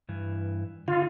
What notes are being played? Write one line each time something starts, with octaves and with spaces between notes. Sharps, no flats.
G2 E3
D3 D#4 F4